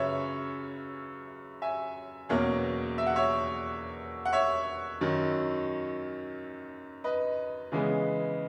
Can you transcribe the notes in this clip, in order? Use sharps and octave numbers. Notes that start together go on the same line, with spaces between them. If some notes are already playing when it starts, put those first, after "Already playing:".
Already playing: F#2 C#3 F#3 C#4 B4 C#5 E5
E5 G#5
E2 B2 F#3 A#3 C#4
E5
F#5
C#5 E5
F#5
C#5 E5
F#2 D#3 F#3
B4 D#5
C#3 E3 G#3 B3